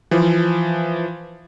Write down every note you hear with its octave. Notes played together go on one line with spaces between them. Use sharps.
E3 F3